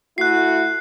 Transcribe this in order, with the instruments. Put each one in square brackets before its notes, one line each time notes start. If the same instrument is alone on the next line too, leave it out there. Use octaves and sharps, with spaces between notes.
[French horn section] A3 E4 F#4 [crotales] F#6 C7